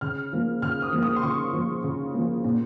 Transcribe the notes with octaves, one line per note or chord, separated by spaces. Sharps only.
C#3 F6
F3 A#3
C#3 F6
D#6
F3 A#3
D#6
C6
C#3 C#6
F3 A#3
C#3
F3 A#3
A#2